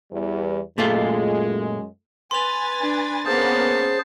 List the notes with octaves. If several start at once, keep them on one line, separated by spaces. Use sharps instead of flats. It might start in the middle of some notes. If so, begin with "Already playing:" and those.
E2 G3
F#2 A#2 G#3 A3 F4
B4 G#5 C6 A6 F7
D4
A#3 B3 C#4 G#4 C5 A5 C7